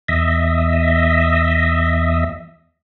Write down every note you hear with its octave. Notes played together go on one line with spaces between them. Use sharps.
E2 D#5 E5